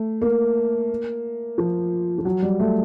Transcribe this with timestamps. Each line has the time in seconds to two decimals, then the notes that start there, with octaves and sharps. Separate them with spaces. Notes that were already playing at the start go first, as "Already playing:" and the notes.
Already playing: A3
0.22 A#3
1.58 F3
2.18 F3
2.25 F#3
2.42 G3
2.60 A3